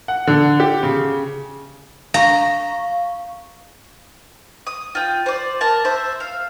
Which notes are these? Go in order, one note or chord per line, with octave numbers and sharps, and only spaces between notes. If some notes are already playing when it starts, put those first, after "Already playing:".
F#5
D3
G4
C#3
F5 A#5 C#6
D#6
F4 G5
C5 D5
A#4 A5
C5 E5
F5